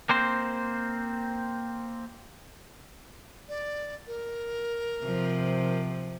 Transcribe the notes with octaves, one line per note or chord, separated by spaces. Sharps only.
A#3 C4 C5
D5
A#4
C3 F3